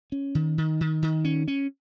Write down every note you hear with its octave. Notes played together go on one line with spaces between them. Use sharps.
C#4
D#3
D#3
D#3
D#3
C#4
C#4